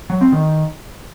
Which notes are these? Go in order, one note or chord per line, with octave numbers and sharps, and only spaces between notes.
F#3
C4
D#3